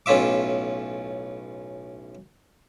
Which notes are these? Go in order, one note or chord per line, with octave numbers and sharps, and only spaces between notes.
B1 A2 C#4 F4 E5 D6